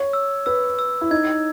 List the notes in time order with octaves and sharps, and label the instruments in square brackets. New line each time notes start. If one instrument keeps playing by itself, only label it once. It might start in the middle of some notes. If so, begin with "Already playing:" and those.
Already playing: [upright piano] C#5
[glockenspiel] E6
[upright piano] B4 [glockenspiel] E6
[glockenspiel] E6
[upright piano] E4
[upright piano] D#4 [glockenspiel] G#6